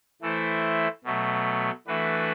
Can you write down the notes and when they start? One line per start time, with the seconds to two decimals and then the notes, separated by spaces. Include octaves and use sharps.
0.22 E3 A3 E4 A4 C5
1.04 B2 F#3 A3
1.87 E3 A3 D4 F#4 B4